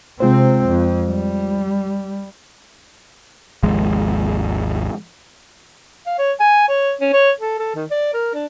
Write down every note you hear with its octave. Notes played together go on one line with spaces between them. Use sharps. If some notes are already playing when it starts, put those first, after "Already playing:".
C3 G#3 C4 F4 C5
F2
G3
G#1 D#2 F3 G#3
F5
C#5
G#5
C#5
C#4
C#5
A4
A4
D#3
D5
A#4
D4